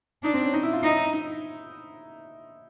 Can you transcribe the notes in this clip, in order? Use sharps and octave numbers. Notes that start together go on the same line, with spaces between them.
D4 D#4
C4
C#4
D#4
E4
F4
D#4 E4
D#4